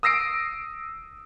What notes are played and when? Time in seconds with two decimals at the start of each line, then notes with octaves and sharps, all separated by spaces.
0.03 D#6 E6 A#6 C7 D7